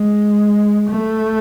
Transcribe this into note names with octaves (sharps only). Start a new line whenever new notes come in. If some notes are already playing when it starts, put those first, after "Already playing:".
Already playing: G#3
A3